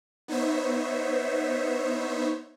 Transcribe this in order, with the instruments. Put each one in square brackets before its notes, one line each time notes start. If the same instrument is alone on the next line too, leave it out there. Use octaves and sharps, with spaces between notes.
[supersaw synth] B3 D#4 C5 C#5 E5